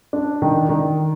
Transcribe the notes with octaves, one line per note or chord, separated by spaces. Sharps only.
D4
D#3
D#3